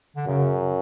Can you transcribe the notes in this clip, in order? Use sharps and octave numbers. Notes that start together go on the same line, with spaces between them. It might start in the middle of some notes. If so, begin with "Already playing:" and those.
D3
F#2 C#3